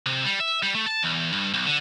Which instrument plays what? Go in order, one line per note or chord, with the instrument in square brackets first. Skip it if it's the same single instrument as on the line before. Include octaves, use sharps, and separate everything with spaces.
[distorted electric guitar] C3
G3
E5
G3
A3
A5
E2
G2
B1
D3